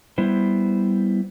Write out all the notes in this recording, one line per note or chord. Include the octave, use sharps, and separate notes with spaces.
G3 B3 E4 C5